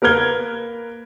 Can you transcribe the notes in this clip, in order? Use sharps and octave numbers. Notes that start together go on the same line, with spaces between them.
A#3 A#4 B4 F6 G#6 G7